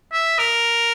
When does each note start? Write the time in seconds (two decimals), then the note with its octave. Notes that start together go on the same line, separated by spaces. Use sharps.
0.13 E5
0.39 A#4